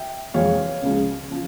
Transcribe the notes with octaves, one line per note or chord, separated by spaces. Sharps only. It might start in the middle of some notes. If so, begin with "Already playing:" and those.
Already playing: E5 G5
F2 E3 G#3 C#5 F5
C#2 C#3 F3 G#3
C#3 F3